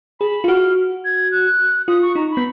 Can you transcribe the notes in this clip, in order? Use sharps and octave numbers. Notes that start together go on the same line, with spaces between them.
G#4 B5
F4
F#4 F6
G#6
F#6
F4 D#6
C#6
D#4 A#5
B5
B3